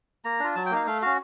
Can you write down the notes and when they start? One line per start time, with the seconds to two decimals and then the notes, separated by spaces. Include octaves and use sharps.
0.24 A#3 A#5
0.40 D4 F4
0.56 F#3 A5
0.66 G5
0.71 A#3 D#4 F5
0.87 A3 F5
1.02 C#4 F#4 F5